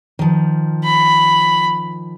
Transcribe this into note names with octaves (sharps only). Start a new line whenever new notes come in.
D#3 F3
B5